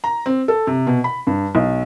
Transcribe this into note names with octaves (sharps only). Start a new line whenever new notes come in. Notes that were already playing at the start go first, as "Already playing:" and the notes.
A#5
C4
A4
C3
B2
B5
G2
B1